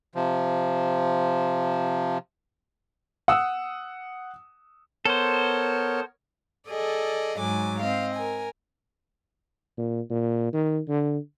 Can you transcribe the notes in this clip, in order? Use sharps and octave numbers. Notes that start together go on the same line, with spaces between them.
C3 F3
F#5 D#6 E6
B3 A4 A#4 C5 C#5
G#4 A4 D5 D#5
G#2 F#3 G#5 D6
C4 D#5 F5
A#4 G#5
A#2
A#2
D#3
D3